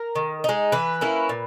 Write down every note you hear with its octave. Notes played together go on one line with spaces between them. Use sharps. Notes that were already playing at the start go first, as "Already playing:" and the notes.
Already playing: A#4
D#3
G#3 D#4
E3 B4
A#3 C#4 E4
A#2